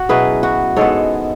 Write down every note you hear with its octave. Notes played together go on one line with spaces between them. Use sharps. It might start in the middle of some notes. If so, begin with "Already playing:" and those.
Already playing: F#4
B2 F#3 C#4 E4 G#4 B4
F#4
G#2 G#3 B3 A4 C#5